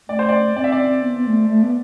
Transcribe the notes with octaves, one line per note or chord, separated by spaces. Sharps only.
A3 D5
C5
D5
C4 D5
E5
D5
B3
B3
A3
A3
B3